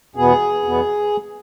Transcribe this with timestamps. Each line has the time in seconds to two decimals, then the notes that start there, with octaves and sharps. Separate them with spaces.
0.16 E2 B2 B3 G#4
0.64 E2 B2 B3